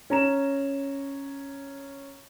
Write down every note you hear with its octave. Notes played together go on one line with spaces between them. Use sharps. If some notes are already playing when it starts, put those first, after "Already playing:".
C#4 A#5 E7